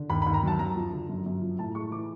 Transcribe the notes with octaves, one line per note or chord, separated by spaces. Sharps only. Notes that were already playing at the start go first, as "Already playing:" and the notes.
Already playing: D3
D#2 B5
B5
D#2
A#5
F#3 A5
F#2 A#5
F3
D3
F#2
F#2
F3
A2 A5
G#3 C#6
E3 D6